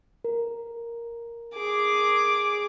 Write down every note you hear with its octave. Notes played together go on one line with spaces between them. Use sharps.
A#4
G#4 D6